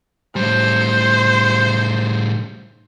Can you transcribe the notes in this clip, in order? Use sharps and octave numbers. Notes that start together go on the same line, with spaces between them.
A2 G3 C5